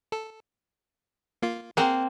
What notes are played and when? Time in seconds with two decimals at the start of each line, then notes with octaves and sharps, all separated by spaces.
0.12 A4
1.42 A#3 F4
1.77 A#3 C4 G#4 A#4 F#5